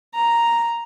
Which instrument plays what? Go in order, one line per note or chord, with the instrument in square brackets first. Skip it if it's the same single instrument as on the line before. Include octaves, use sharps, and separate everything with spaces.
[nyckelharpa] A#5